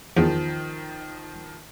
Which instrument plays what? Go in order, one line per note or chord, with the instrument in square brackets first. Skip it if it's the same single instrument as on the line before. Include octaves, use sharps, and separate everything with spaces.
[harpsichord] E2 [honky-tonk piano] D#3 F3